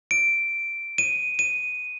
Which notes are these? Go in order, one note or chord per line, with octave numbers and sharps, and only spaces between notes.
D7
D#7
D#7